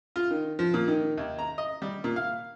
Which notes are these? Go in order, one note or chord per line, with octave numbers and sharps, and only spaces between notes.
F4
D#3
F3
A#2
D#3
D#2
A#5
D#5
G3
A#2
F5